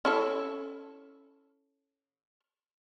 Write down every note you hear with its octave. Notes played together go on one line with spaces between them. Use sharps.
C#4 E4 A4